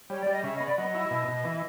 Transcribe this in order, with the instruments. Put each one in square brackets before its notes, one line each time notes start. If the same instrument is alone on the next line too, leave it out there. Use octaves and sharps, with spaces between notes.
[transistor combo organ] G3 [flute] C#5
[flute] D5
[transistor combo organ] G3
[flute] D#5
[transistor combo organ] C#3 [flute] E5
[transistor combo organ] B3 [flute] D#5
[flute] D5
[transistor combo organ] F#3 [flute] D#5
[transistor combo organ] E4
B2
B2
E3